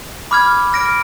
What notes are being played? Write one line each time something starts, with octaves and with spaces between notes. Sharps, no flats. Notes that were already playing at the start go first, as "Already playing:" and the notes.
B5 D6 F6 G#6
F6 A#6 D7